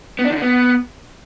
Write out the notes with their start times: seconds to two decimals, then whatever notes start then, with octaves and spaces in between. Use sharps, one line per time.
0.19 B3
0.25 D4
0.30 D#3
0.36 D3
0.42 B3